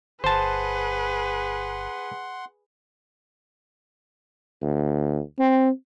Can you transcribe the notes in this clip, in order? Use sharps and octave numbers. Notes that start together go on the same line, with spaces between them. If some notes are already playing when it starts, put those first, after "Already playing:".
G1 G#4 B4 C5 F#5 A5 C6
D2
C4